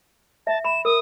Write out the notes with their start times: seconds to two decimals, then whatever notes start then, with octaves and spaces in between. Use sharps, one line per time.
0.47 E5 A5
0.65 B5 E7
0.85 A#4 D#6